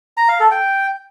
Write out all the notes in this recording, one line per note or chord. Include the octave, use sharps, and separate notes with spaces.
A#5
F5
A4
G5